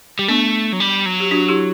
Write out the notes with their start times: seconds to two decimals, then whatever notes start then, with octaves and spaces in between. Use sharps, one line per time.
0.19 G3
0.28 A3 B3 D4
0.73 F#3
0.80 G3
1.06 F#3
1.20 G4
1.31 D4 F#4
1.49 E4 G4